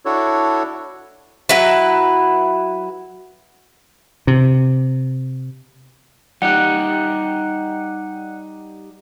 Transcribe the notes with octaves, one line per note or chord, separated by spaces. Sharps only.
D4 E4 F#4 A4 C#5
F#3 E4 B4
C3
G3 D#4 G4 F#5 F#6